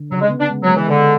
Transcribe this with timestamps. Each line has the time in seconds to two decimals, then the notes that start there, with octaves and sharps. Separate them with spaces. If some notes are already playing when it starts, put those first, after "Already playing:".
Already playing: D3
0.11 C#3 F#3
0.21 G#3
0.30 B3
0.40 D4
0.50 G#3
0.63 F#3
0.70 G#3
0.76 E3
0.88 D3 G#3